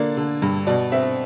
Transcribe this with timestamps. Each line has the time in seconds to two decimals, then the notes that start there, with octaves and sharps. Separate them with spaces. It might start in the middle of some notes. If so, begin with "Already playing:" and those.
Already playing: D3 A#3 D5
0.17 D3
0.42 G2
0.67 B2 D5
0.92 C4 E5